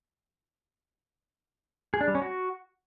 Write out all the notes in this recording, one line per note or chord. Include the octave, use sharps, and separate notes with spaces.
G#4
D4
G3
C#4
F#4